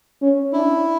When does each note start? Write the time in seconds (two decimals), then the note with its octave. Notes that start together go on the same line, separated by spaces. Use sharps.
0.22 C#4
0.53 D4 E4